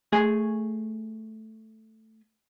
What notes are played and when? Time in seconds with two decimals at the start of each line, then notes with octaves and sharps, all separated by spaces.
0.12 A3 G#4 G#5